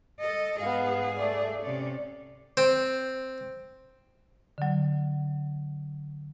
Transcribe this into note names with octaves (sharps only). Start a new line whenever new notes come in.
A4 D#5
G#2 B3 G#4 F5
A3 D5
C3 C#4 D5
C4
D3 F#3